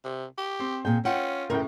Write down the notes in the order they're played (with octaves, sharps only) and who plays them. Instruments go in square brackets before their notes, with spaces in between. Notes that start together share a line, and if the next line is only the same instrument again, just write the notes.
[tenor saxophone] C3
G4
[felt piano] C4
[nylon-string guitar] A#2 G#4 G5
[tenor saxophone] C#4 [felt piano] F4 G5 [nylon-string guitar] F#5
[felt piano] F#2 A2 C#3 [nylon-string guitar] A#4 G5